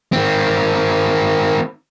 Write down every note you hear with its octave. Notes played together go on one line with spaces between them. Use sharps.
D#3 C4